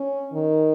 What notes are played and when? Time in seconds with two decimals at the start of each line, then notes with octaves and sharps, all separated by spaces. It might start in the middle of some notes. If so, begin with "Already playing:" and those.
Already playing: C#4
0.32 D#3